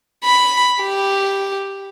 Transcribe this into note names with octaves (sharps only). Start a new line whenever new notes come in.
B5
G4